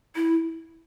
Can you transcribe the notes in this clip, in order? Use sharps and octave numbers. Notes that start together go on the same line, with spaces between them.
E4